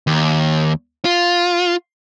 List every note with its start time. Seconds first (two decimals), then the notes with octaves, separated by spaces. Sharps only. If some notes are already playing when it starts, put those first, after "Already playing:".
0.07 D#2
1.05 F4